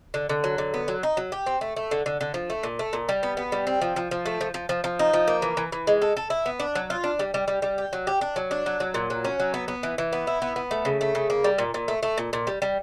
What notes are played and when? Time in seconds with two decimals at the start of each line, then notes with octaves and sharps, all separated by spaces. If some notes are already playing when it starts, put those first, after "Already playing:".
0.14 D3
0.29 D3
0.44 F#3
0.58 D3
0.74 B3
0.88 F#3
1.03 D#4
1.17 F#3
1.32 G4
1.46 C4
1.61 A3
1.76 A3
1.91 D3
2.06 D3
2.21 D3
2.34 F3
2.50 A3
2.63 A#2
2.79 A3
2.93 A#2
3.09 G3
3.23 B3
3.37 B3
3.52 G3
3.67 C4
3.81 F3
3.96 F3
4.11 F3
4.26 A3
4.41 F3
4.54 F3
4.69 F3
4.84 F3
4.99 D#4
5.13 F3
5.27 A#3
5.42 E3
5.57 E3
5.72 E3
5.87 G#3
6.02 A4
6.17 A4
6.30 E4
6.46 B3
6.60 D4
6.75 F#3
6.90 F4
7.04 D4
7.19 G3
7.34 G3
7.48 G3
7.62 G3
7.78 G4
7.93 F#3
8.07 G4
8.21 D4
8.36 F#3
8.51 D4
8.66 F#3
8.80 F#3
8.94 A#2
9.10 F#3
9.25 C#4
9.40 F#3
9.54 B3
9.68 B3
9.83 E3
9.98 E3
10.13 B3
10.27 E4
10.42 B3
10.56 B3
10.71 A3
10.85 C#3
11.01 A3
11.15 C#3
11.30 A#3
11.44 G3
11.58 A#2
11.74 A#2
11.88 A3
12.03 A3
12.18 A#2
12.33 A#2
12.47 G3
12.62 G3